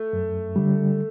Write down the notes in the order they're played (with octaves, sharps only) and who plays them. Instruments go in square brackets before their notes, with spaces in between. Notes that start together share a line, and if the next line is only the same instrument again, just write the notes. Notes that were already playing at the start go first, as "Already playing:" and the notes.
Already playing: [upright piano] A3
[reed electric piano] F#2
D3 G3